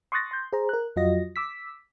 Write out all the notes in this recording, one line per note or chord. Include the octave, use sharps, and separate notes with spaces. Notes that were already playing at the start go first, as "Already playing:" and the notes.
C6 C#6 D#6 F#6 A6 A#6
C6 G6
G#4 C5 A#5
A#4 F#6
F2 F#3 F4 F#4 D#5 A#6
D6 E6 B6